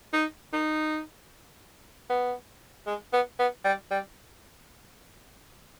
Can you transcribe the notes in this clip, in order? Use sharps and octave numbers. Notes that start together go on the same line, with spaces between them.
D#4
D#4
B3
G#3
B3
B3
G3
G3